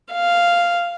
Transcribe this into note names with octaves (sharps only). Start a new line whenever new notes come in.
F5